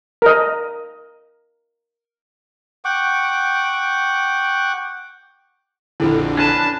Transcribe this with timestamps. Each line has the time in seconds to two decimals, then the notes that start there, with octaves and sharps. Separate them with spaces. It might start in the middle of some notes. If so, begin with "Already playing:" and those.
0.22 A#4 D#5
2.85 F#5 G5 C#6 D6
6.00 A#1 F2 D3 E4 A4 B5
6.37 C#4 D4 B4 A5